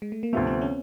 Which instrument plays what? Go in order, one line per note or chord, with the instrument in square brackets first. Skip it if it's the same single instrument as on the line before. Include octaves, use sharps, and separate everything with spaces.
[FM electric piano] G#3
A3
A#3
[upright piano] D2 C3 F3 A3 [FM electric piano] B3
[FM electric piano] C4
C#4